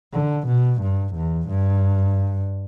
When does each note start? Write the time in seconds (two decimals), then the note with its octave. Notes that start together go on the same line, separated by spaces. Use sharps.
0.14 D3
0.47 B2
0.81 G2
1.15 E2
1.48 G2